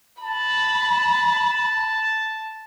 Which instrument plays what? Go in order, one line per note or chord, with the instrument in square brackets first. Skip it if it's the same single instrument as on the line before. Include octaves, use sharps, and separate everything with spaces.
[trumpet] A5 [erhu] B5